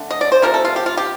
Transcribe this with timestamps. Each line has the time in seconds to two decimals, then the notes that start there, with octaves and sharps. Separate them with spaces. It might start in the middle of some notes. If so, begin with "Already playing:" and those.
Already playing: D3 A3 D4
0.11 D#5
0.21 D5
0.32 C5
0.42 C3 F3 A3 A#4
0.54 A4
0.65 F4
0.76 G4
0.86 F4
0.97 G4